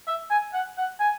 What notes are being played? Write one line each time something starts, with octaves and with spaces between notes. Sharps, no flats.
E5
G#5
F#5
F#5
G#5